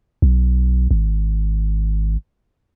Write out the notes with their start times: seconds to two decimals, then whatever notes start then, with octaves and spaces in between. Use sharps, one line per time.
0.22 B1
0.91 G#1